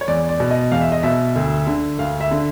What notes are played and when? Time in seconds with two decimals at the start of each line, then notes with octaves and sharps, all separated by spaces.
0.01 C#5
0.08 E2 D5
0.29 D5
0.40 B2
0.51 D#5
0.72 E2 F5
0.81 E5
0.92 D#5
1.03 B2 E5
1.36 D2
1.67 D3
1.98 D2 F5
2.21 E5
2.31 D3